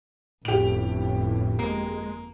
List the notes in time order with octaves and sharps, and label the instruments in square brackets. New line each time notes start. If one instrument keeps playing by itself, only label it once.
[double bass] G1 F2 [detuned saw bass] A2 [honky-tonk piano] G4 F7
[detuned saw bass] G#3 [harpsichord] A#3